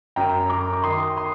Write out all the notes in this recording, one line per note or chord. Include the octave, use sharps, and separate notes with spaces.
F#2 G5 A#5
F#2 A#5 D6
D6
D#3 C6 D#6
C6 D#6